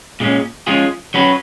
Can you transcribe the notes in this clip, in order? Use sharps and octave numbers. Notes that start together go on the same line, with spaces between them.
A#2 G#3 C#4
F3 G#3 C#4 F4 G#4
F#3 C#4 F#4 B4